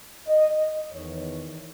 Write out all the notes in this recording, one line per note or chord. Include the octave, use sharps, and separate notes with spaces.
D#5
E2 D#3 C#5